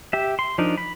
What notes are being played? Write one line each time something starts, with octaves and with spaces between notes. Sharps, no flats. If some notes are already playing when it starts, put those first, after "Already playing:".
G4 E5
C6
F3 D4 D#4 A#4
B5